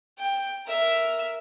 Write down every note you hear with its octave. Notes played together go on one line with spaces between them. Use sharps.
G5
A#4 E5